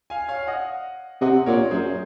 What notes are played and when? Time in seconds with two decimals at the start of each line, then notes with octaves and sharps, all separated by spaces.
0.10 F5 G#5
0.29 C#5 F5
0.47 D#5 F#5
1.21 C3 D#5 F#5
1.46 A#2 A#4 C#5
1.71 F#2 G#4 C5